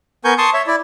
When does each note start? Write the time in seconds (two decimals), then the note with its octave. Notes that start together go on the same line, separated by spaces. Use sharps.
0.25 B3 A#4 G#5 C#6 G6
0.38 A5 C6 C#6 D#6
0.54 C#5 E5
0.67 E4 D5